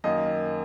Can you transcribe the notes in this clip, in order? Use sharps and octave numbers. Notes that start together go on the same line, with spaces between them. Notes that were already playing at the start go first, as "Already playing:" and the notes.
F#2 D#3 A#3 D#5